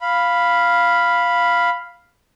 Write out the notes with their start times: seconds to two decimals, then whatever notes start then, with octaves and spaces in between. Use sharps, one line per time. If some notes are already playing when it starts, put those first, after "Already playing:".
0.01 F5 B5